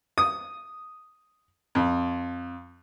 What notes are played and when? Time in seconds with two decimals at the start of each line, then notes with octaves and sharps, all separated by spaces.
0.18 D#6
1.75 F2